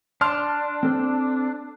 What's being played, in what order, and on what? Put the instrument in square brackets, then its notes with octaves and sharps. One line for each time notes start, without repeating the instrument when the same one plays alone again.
[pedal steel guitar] D4 [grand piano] A5 C6 F6
[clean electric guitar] C4 A4 C5